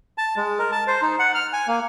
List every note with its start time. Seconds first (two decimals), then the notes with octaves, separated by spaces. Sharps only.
0.18 A5
0.37 G#3
0.59 A#4
0.72 A5
0.87 C5
1.02 D#4
1.19 F#5
1.35 F6
1.53 G#5
1.68 A#3